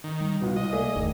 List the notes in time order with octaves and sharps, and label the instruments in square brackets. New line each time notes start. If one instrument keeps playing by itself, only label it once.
[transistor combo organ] D#3
[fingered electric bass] G3
[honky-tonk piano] C#2 F4 [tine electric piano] B3 F#4
[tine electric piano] C2 [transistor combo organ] D#5
[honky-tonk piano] A#3 G#4 D5 [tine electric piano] E5
[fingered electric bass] F#1 E2 A3 [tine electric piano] D#3